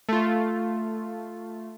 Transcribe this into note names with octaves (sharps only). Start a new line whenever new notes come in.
A3 F4